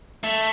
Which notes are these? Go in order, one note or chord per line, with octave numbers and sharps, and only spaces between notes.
A3